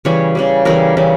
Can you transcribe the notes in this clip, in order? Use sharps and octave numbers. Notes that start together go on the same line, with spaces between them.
C#3 E3 G3 C#5
C#3 E3 G3
C#3 E3 G3 A#4
C#3 E3 G3